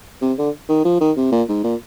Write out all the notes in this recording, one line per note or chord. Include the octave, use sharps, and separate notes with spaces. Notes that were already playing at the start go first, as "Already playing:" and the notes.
C3
D3
D#3
F3
D#3
C3
A#2
G#2
A#2